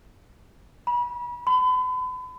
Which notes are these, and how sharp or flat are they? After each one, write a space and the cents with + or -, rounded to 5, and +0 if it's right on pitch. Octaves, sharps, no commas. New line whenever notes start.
B5 -35
B5 +40